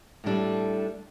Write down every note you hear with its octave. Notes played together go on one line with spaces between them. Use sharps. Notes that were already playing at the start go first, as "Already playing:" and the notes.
A2 G3 D4 A4